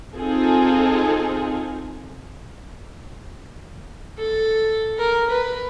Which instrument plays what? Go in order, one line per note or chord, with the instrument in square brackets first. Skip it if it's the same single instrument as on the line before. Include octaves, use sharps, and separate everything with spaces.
[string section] C4 D#4 F4 G#4 A4
[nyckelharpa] A4
A#4
B4